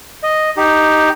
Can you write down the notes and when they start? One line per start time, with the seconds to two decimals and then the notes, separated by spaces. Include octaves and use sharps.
0.23 D#5
0.57 D#4 G4